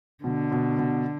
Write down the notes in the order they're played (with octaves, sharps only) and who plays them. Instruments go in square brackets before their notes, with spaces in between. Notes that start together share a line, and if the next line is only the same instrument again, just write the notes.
[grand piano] B2 [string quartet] D3
[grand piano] B2
B2